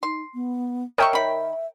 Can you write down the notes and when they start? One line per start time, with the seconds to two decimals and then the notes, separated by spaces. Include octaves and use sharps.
0.03 D#4 C6
0.34 B3
0.98 A#4 C#5 D#5 E5 G5 C#6
1.13 D#3 E5 B5